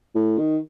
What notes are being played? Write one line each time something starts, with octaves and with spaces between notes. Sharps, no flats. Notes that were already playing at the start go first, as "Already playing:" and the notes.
A2
D#3